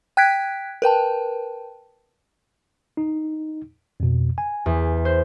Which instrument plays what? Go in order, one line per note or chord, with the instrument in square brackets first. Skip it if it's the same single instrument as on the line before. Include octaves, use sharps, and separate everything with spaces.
[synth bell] G5 F#6 G#6 B6 D7
A#4 B4 G5 A5
[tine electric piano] D#4
F2 B2
G#5
[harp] E2
C5